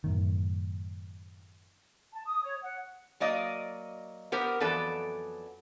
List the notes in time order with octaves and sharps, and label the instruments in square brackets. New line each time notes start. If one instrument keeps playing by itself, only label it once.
[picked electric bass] F#2 A2 D#3
[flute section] A5
D#6
C#5
F#5
[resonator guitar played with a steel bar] F#3 A#3 D5 D#5
B3 G4 A#4 C5
F2 E3 F#3 B3 A4 D5